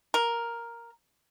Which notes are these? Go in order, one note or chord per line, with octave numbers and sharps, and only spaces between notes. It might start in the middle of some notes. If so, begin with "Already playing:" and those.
A#4